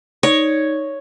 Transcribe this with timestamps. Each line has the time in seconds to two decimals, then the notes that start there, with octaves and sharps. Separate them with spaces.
0.23 D#4 C#5 D5